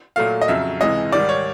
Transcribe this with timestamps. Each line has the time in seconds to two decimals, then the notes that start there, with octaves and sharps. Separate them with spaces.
0.16 A#2 F#3 A3 F5
0.41 D#5
0.48 F2 C#3 F#3 E5
0.81 C#2 C3 E3 G#3 D#5
1.12 G#2 D#3 G3 D5
1.29 C#5